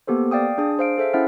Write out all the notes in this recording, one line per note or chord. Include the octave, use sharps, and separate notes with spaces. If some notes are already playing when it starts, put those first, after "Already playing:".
A#3 B3 G4 A4 C5
D5 F5 G5 D#6
D4 G#4 D#6
C5 F5 D7
G#4 A4 C5 E5 F5
C#4 E4 C5 E5 F#5 F6